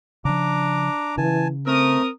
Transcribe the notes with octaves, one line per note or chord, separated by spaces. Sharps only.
C#3 F3 D4 A#5 D6
C#3 E3 G#5 A5
A3 C4 A#4 A#5 D#6